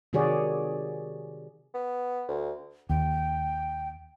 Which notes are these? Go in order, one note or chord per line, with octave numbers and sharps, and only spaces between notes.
C3 D#3 F#4 G#4 C#5 D5
B3
D2
D#2 G5